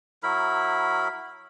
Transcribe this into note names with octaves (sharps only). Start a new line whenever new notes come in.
F#3 E4 A#4 B5